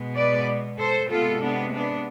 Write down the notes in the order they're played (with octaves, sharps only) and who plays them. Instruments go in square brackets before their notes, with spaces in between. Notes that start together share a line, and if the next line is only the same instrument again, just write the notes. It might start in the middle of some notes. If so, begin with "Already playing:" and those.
Already playing: [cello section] B2 G#3 B3
B4 D5
A4 C5
C3 G#3 B3 F4 A4
B3 D4
B3 D4